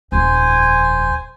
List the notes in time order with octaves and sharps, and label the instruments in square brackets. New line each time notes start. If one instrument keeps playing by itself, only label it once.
[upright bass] D#1 F2 [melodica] C5 G#5